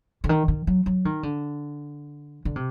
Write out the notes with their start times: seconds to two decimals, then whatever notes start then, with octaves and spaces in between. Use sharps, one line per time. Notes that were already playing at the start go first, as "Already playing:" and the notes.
0.24 D3
0.29 D#3
0.48 D#3
0.67 F#3
0.86 F#3
1.05 D#3
1.23 D3
2.45 D3
2.56 C3